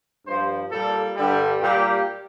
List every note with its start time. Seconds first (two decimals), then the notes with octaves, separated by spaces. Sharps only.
0.26 G2 F3 C5
0.71 A#2 G3 A4
1.16 G2 D3 G3
1.60 A#2 G3 G4